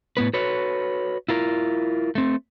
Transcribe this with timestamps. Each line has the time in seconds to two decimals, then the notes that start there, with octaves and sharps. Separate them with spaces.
0.17 A2 B3 B4
0.34 F#4 A4 B4 C#5
1.29 E4 F4 A#4
2.15 A3 C4